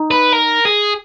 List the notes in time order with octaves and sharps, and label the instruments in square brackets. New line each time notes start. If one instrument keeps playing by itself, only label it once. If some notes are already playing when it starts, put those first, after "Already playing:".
Already playing: [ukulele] D#4
[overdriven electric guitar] B4
A#4
G#4